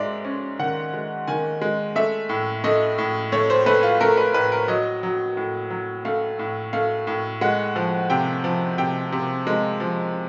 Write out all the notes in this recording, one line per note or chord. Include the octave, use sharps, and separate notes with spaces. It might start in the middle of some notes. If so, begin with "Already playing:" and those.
Already playing: G#2 G#3 D5 E5
C#4
D#3 F#5
G#3
D#3 G#5
G#3
A3 E5
A2
A3 D#5
A2
A3 C#5
C5
A3 B4
F4
A3 A#4
B4
A2 B4
A#4
F#3 D#5
F#3
A2
F#3
A3 F5
A2
A3 F5
A2
G#3 F#5
F3
C3 G5
F3
C3 G5
C3
G#3
F3